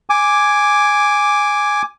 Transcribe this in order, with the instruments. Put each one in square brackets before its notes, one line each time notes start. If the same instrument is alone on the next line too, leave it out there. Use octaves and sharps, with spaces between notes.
[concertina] G#5 D6